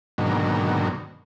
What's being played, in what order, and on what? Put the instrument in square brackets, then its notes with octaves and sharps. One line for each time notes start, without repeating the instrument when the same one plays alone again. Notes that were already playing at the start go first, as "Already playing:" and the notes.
[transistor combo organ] G#2 B2 D3 D#3 F#3 A#3